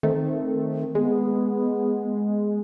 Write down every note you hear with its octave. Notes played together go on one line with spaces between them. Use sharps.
D#3 A3 C4
G#3 B3